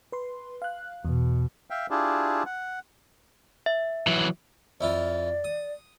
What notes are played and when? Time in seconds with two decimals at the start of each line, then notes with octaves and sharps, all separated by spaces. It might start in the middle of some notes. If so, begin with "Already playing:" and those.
0.12 B4 C6
0.62 F5 F#6
1.05 E2 B2
1.70 E5 F5 G5
1.91 D4 E4 F4 G4 G#4
2.46 F#5
3.66 E5
4.07 E3 F#3
4.81 F2 E4 F4 D5
5.44 D#6